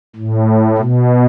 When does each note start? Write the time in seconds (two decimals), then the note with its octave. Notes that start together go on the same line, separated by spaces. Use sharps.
0.16 A2
0.78 B2